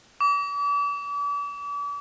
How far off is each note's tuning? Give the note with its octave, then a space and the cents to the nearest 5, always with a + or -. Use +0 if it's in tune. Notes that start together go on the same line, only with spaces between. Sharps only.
D6 -40